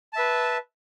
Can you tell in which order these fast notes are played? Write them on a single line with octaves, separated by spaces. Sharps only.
A5 E5 B4